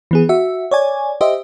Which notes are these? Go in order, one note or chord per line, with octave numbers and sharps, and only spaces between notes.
E3 B3 G#4
F#4 E5
C#5 D5 G#5
G4 C5 D#5 E5